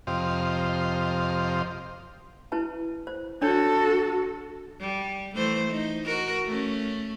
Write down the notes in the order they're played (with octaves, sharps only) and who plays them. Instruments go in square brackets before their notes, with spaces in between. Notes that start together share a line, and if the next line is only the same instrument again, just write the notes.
[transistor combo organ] F2 C3 G4 D#5 F5 C6
[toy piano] E4 B4 A5
C5
[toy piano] D4 C#5 [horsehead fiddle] F#4 A4
[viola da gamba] G3
E3 A3 C5
D#4
F#4 A#4
A3 C#4